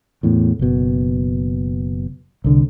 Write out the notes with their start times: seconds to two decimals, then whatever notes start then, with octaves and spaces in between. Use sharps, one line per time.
0.23 E2 A2
0.59 F#1 B2
2.44 C2 D3